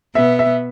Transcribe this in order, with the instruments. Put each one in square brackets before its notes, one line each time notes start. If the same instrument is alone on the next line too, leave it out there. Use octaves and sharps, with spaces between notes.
[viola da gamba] B2 B3 [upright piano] E5
[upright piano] E5